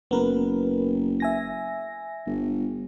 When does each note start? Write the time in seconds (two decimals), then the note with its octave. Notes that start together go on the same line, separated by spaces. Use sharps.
0.11 F#1 B3 A#4 B4
1.20 E5 G#5 A#6
2.27 G1